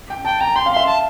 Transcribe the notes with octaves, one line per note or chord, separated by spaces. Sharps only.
G5
G5 A5
G5 A#5
G5 C6
F5
E5 C6
A5